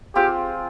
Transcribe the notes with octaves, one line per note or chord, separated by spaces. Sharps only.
C4 F4 G4 G#4